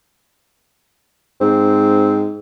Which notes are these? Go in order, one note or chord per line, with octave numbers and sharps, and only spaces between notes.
G#2 C4